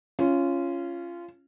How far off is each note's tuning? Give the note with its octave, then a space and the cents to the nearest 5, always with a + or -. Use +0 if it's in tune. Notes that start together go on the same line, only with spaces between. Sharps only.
C#4 +0 F4 -20